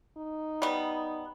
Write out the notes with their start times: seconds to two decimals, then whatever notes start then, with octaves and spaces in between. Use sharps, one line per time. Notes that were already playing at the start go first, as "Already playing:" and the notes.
0.17 D#4
0.62 G3 B3